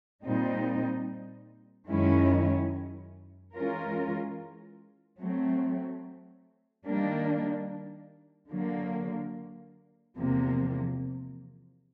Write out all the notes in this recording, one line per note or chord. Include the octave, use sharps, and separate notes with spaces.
A#2 G3 C4 D#4
F#2 D#3 G#3 C#4 E4
E3 G#3 C#4 F4 A#4
F#3 A3 C4
D#3 G3 A#3 D4
D3 F#3 A#3
E2 C3 F3 A#3